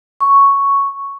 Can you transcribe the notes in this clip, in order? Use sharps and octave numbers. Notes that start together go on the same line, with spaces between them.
C#6